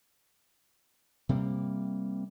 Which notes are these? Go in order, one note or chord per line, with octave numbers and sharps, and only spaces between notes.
C3 G3 A#3